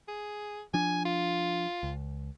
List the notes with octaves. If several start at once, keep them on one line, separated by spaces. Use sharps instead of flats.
G#4
F3 D4 G#5
F4
C#2